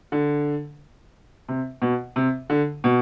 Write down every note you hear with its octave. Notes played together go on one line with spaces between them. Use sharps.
D3
C3
B2
C3
D3
B2